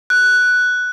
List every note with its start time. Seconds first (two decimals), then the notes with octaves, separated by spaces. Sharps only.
0.10 F#6